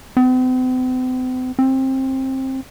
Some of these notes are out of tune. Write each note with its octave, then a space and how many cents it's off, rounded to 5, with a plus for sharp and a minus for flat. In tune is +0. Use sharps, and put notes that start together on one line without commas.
C4 -45
C4 +20